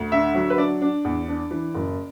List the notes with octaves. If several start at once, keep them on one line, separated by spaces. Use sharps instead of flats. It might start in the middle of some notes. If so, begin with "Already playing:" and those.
Already playing: D2
D3 E5
F#3
B4
D4 D5
D4
E2
D4
E3
F#1